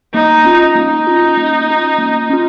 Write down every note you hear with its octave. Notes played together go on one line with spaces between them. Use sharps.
A#3 D#4
C#4 F4
A#3 D#4
C#4 F4
A#3
C#4 F4
A#3
C#4 F4